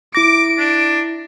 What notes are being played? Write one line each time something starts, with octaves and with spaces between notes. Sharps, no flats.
E4 D6 A#6 D7
D4